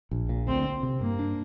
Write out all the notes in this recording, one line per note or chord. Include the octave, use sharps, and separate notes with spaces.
A#1
A#2
D2 C4
C4
C3
G2 A#3
D4